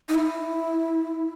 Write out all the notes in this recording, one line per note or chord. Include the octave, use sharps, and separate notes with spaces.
D#4
E4